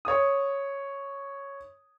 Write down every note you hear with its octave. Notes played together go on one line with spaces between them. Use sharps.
C#5 D#6